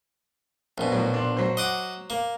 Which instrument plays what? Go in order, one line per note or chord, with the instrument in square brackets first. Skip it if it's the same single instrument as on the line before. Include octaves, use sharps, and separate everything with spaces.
[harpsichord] A#1 B2
[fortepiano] A2 F#3
D4 C6
F#3 C5
[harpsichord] D#5 F#5 D6
A#3